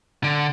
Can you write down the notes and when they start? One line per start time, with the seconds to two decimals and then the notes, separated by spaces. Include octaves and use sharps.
0.24 D3